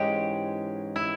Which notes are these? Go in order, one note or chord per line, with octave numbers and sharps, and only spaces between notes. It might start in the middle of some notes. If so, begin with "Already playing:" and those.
Already playing: G#2 E3 G#3 C#4 G4
E4